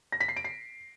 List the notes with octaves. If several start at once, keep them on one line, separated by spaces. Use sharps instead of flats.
A#6
B6
C7
D7
C7